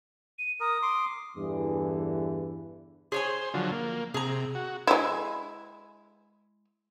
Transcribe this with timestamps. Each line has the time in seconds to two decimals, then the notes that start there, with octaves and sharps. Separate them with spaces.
0.38 D#7
0.60 A#4 D#6
0.82 C6 D6
1.37 E2 G2 D3 E3
3.12 G#4 C5 C#5 G#5
3.54 D3 F3 F#3
3.72 A#3
4.14 C3 G#4 A#5
4.55 F#4
4.87 G#3 E4